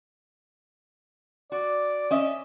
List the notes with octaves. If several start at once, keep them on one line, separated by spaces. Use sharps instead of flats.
F#4 D5
C#4 D#5 E5